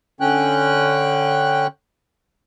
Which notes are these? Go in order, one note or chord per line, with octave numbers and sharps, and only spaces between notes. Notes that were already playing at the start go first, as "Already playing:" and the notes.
D3 C#4 G5 F#6